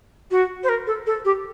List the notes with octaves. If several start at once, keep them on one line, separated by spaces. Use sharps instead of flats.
F#4
C5
A#4
A4
A4
G4